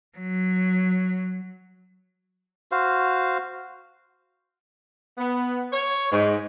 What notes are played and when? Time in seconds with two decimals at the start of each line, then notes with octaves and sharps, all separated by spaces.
0.18 F#3
2.72 F#4 C5 F5
5.18 B3
5.71 C#5
6.11 G#2